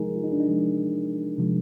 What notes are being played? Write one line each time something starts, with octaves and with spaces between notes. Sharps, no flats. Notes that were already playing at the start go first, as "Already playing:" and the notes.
Already playing: C3 F3 G#3 D#4 G#4 A#4
F4
D#4
D4
D#4
C3 F3 G#3
C3 F3 G#3